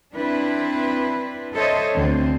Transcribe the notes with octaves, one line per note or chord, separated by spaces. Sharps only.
C4 D4 E4 B4
A4 C5 C#5 D#5 E5
D2 D3 C4